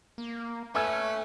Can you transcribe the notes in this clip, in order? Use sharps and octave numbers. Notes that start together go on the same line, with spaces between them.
A#3
A3 C#4 B4 G#5 E6 G#6